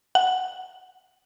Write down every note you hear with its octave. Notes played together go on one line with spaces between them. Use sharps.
F#5